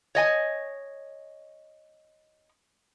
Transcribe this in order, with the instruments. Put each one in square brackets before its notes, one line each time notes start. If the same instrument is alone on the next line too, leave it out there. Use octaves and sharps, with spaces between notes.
[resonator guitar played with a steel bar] C#5 D#5 G#5